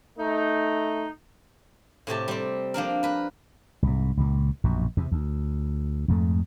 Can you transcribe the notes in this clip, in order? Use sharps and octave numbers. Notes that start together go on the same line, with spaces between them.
A3 D#4
A2 C3 G4 A5
G3 C4
F3 A#3 D4 A#4
A#4 B4
C2 G#2
C#2 A#2
A#1 F#2 B2
E2 C3
D2
F2 G#2 A3